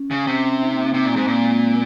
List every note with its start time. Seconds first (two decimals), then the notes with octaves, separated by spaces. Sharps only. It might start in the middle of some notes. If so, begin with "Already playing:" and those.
Already playing: C#4
0.11 C#3
0.27 C3 C#4
0.43 C#4
0.60 D#4
0.71 A#3
0.82 C4
0.94 C3 C4
1.02 A#3
1.05 A#2
1.10 C4
1.16 G#2 A#3
1.27 A#2 C4
1.38 G#3
1.49 G#3
1.60 A#3